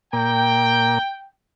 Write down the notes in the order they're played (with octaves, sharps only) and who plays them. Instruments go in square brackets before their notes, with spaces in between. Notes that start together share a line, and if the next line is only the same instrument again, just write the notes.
[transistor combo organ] A#2 A#3 [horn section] G5